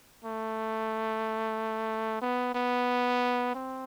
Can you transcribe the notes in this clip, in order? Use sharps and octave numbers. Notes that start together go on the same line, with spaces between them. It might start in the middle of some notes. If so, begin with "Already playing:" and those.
A3
B3
B3
C4